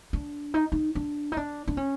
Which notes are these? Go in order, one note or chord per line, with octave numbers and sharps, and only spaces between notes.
D4
D#4
D#4
D4
D#4
D4
D4
C#4